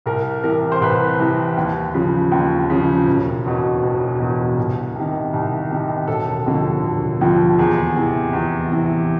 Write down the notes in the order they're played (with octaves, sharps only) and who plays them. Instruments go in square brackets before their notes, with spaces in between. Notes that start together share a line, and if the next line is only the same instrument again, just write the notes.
[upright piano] C2 A#4
C3 E3 A#4
C5
C2 B4
C3 E3
D#2
C#3 F3
D#2
C#3 F3
E1
E2 B2
E1
E2 B2
C2
C3 D#3
C2
C3 D#3
E1 A4
D#2 D3 F3
E1
D#2 D3 F3
E2 G#4
C3 E3
E2
C3 E3